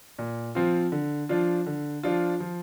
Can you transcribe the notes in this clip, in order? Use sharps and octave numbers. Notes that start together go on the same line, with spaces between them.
A#2
F3 C4 F4
D3
F3 D4 F4
D3
F3 D4 F4
F3